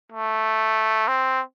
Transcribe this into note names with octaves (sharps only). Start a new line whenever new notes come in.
A3
C4